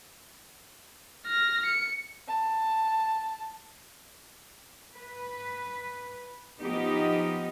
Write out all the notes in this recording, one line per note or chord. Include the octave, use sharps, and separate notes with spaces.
F6 A#6
C#7
A5
B4
F3 B3 D#4 G4